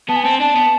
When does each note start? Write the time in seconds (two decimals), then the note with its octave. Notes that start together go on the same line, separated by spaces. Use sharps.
0.09 B3 A5
0.16 G#5
0.23 C4 A5
0.40 D4 A5
0.55 B3